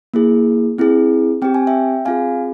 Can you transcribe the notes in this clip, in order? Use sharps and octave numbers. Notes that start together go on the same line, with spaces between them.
A#3 E4 G#4
C4 E4 G#4
C4 G4 G5
G#5
E5 G5
C4 F4 G#4 F5 G#5